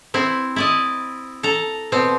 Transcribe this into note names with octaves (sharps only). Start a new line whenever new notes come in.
C4 E4
E4 D5 D#5
A4 A#5
B2 C4